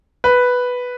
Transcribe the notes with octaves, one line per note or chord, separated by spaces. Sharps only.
B4